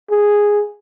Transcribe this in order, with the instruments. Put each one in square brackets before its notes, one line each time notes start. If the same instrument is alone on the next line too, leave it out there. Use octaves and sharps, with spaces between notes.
[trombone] G#4